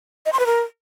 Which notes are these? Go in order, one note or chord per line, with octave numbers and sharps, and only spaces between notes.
D#5
C6
B4
A#4